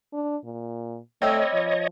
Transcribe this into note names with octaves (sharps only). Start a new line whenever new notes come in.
D4
A#2
G3 A3 C4 C#5 D#5
F3